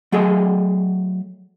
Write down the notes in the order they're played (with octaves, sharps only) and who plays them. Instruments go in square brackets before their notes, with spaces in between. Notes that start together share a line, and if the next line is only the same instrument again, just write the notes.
[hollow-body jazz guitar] F#3 A3 G#4 A4 D#5